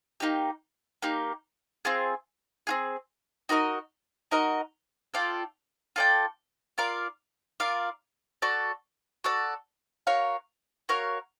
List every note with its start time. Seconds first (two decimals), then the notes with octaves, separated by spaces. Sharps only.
0.20 A#3 D#4 G4
1.02 A#3 D#4 G4
1.85 C4 F4 G#4
2.67 C4 F4 G#4
3.49 D#4 F#4 A#4 D#5
4.31 D#4 F#4 A#4 D#5
5.14 F4 A4 D5 G5
5.96 F4 A4 D5 G5
6.78 F4 A#4 D5 F5
7.60 F4 A#4 D5 F5
8.42 F#4 A4 D5
9.24 F#4 A4 D5
10.07 F#4 A#4 C#5 F5
10.89 F#4 A#4 C#5 F5